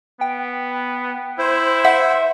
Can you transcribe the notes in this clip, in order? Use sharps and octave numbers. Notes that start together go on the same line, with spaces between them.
B3 G5
E4 C5
E5 F#5